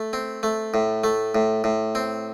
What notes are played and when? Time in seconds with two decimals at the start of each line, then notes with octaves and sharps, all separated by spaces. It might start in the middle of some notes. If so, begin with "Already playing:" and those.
Already playing: A3
0.13 C4
0.43 A3
0.74 A2
1.04 A3
1.35 A2
1.64 A2
1.95 C4